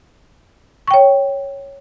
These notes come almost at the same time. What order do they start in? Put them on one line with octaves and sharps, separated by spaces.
C#6 G5 C#5